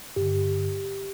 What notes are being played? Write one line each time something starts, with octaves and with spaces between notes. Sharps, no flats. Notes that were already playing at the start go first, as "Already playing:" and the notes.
G2 D3 G4